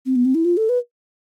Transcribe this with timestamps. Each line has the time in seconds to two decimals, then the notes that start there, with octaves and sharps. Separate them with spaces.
0.06 C4
0.16 B3
0.25 C4
0.35 E4
0.45 F4
0.57 A4
0.69 B4